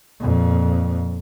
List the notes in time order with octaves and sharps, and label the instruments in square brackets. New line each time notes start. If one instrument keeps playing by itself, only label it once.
[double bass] F2 A#2